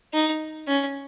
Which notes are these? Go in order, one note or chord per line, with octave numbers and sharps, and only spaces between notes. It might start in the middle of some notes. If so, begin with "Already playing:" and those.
D#4
C#4